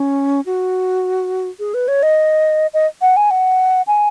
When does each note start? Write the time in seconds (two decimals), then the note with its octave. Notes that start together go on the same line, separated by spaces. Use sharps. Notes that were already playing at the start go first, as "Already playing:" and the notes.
Already playing: C#4
0.46 F#4
1.60 G#4
1.74 B4
1.88 C#5
2.03 D#5
2.74 D#5
3.02 F#5
3.17 G#5
3.31 F#5
3.87 G#5